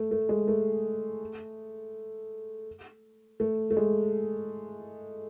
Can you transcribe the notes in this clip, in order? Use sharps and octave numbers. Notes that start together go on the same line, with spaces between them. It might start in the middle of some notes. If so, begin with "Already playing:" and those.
Already playing: A3
A3
G#3
A3
A3
A3
G#3